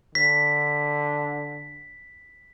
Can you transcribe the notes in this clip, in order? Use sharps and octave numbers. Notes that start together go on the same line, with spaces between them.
D3 B6